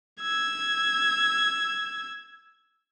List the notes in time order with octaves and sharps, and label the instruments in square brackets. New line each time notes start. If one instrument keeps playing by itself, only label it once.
[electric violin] E6 G#6